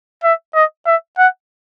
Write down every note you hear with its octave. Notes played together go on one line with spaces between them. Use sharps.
E5
D#5
E5
F#5